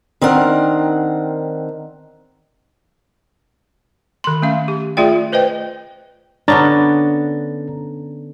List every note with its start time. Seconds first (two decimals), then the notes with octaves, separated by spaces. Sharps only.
0.21 D#3 C4 D4 A#4 F#5
4.24 D#3 C6
4.42 A3 C#4 F5
4.68 G4
4.97 A3 F4 G#4 D5 G5
5.32 B4 C5 D#5 G5
6.48 D3 B3 C#4 D4 A#5 A6